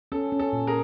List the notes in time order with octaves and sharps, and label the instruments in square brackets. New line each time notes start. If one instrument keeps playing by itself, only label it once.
[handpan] C#4 [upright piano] A4
[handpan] C#4
[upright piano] A4
[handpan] A#2
[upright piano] G#4 A#4